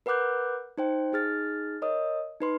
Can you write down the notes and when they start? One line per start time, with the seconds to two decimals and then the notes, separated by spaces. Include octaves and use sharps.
0.06 A#4 B4 F#5 D6 F#6 G6
0.78 D#4 C5 G5
1.13 D#4 G#4 F6 A6
1.82 A#4 C#5 D#5 D#6
2.40 D#4 B4 C6